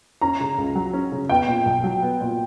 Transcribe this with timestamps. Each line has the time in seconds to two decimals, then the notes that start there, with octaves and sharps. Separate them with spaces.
0.22 C#4 A#5
0.41 C#3
0.58 C#2
0.75 F#3
0.93 C#4
1.12 C#3
1.29 B3 G5
1.48 A#2
1.66 B1
1.84 F#3
2.02 B3
2.21 A#2